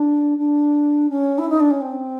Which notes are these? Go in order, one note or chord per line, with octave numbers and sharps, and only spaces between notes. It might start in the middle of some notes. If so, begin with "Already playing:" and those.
Already playing: D4
D4
C#4
E4
D#4
D4
C#4
C4